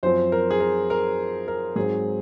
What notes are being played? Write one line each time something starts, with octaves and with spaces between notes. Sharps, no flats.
F#2 F3 C4 C5
A#4
G#4
A#4
A#4
A#4
G#2 F#3 C4 G#4